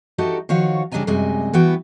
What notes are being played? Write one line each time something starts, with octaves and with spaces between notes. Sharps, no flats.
D#4 F#4 G4 A4 D#5 E5
D#3 F3 F#4 C#5 F5
C#3 G3 D4 D#5 G#5 A#5
F#2 C3 G3 G#3 D#5 G#5
E3 B3 F#4 G5